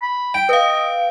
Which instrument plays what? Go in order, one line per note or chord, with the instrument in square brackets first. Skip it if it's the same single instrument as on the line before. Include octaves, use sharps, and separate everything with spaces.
[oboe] B5
[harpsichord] G5
[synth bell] B4 F5 [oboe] D#5